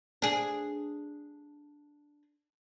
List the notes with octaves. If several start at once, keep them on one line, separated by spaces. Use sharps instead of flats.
D4 G#4